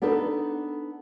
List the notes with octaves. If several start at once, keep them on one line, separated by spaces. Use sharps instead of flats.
B3 D4 D#4 A4 B4